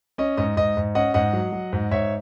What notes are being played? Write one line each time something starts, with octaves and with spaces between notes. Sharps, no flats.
C#4 D#5
G#2 D#5
G#2 D#5
G#2
C#4 D#5 F#5
G#2 D#5 F#5
F#3
F#3
G#2
G#2 C#5 E5